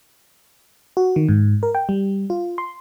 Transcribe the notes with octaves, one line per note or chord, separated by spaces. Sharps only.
F#4
D#3
G#2
A#4
G5
G3
F4
C6